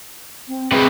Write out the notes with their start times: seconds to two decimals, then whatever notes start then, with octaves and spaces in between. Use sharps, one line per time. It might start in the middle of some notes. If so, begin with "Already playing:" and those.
0.48 C4
0.72 C3 G#4 B4